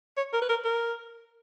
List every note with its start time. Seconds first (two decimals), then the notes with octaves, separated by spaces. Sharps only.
0.17 C#5
0.33 A#4
0.42 B4
0.49 A#4
0.64 A#4